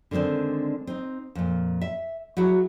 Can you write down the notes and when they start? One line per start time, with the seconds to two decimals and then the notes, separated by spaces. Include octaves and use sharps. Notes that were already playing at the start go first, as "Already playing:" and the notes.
0.11 D3 D#3 G#3 C4 D4
0.87 C4 D#4
1.35 F2 A#2
1.81 E5
2.37 F#3 E4 F#4 G#4